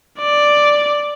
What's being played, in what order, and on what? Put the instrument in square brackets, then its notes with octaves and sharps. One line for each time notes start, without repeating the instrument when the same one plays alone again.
[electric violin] D5